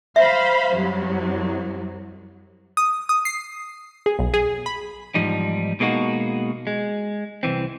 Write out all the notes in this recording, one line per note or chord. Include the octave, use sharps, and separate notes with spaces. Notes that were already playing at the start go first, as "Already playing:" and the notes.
C5 E5 F5 B5
C2 F#2 F#3
D#6
D#6
C7
G#4
B1
G#4
B5
E2 G#2 F3 G3 D#4
B2 G#3 A#3 D#4 F#4
G#3
C2 F2 E3 C4